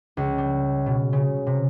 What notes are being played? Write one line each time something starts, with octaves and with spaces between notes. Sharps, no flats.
C#2
G3
B2
C#3
C3